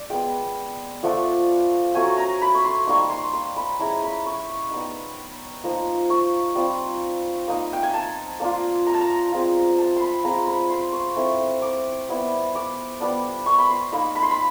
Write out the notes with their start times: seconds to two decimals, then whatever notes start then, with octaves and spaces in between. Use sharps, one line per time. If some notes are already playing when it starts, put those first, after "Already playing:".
Already playing: D5
0.10 G#3 B3 D4 G5
1.03 F3 A3 D4 F#5
1.94 F#3 A3 C#4 G#5
2.17 A#5
2.42 B5
2.55 C#6
2.65 C6
2.87 G3 A#3 D#4 C#6
3.10 C6
3.33 C6
3.56 B5
3.79 G#3 C#4 E4 A#5
4.03 B5
4.26 C#6
4.71 G3 B3 D#4
5.64 F3 A#3 D#4
6.10 C#6
6.55 G3 C4 F4
7.48 A#3 D#4
7.73 G5
7.83 G#5
7.94 A5
8.40 A#3 D4 F4
8.87 A#5
8.94 A5
9.01 A#5
9.32 G#3 C4 F4
9.78 A5
9.96 B5 C6
10.24 G#3 C4 F4 A#5
10.47 B5
10.70 C6
10.93 C#6
11.16 A3 C4 E4
11.62 D6
12.09 G3 B3 E4
12.55 D6
13.01 G3 B3 D4
13.46 C#6
13.59 B5
13.70 C6
13.92 A#3 D#4 B5
14.15 B5
14.23 C6
14.31 B5